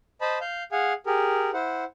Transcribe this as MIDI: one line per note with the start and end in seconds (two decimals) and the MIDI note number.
0.21 0.39 72
0.21 0.39 75
0.21 0.39 81
0.21 0.39 83
0.41 0.63 77
0.41 0.63 91
0.72 0.93 68
0.72 0.93 77
0.72 0.93 78
0.72 0.93 80
1.06 1.50 67
1.06 1.50 68
1.06 1.50 70
1.54 1.84 64
1.54 1.84 72
1.54 1.84 78